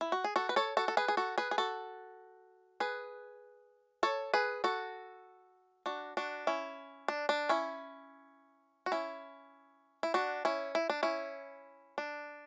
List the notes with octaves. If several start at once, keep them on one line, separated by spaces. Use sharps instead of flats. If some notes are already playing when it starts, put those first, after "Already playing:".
E4
F#4
G#4
F#4 A4
B4
A4 C#5
F#4 A4
A4
G#4 B4
G#4
F#4 A4
G#4 B4
G#4
F#4 A4
G#4 B4
A4 C#5
G#4 B4
F#4 A4
D4 F#4
D4 F#4
C#4 E4
D4
D4
C#4 E4
F#4
C#4 E4
E4
D4 F#4
C#4 E4
E4
D4
C#4 E4
D4